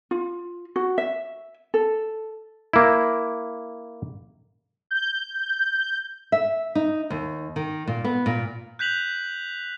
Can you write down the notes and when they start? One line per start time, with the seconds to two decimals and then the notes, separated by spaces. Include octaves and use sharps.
0.11 F4
0.76 F#4
0.98 E5
1.74 A4
2.73 A#3 E4
4.91 G6
6.32 E5
6.75 D#4
7.10 D#2
7.56 D#3
7.87 A#2
8.04 B3
8.26 A#2
8.79 F#6 G6 B6 F7 F#7